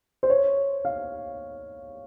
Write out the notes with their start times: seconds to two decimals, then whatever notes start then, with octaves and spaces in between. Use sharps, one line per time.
0.23 C5
0.30 C#5
0.85 F5